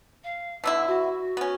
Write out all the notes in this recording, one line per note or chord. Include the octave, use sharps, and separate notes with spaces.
F5
B2 D3 E4 E6
F#4
B3 C#4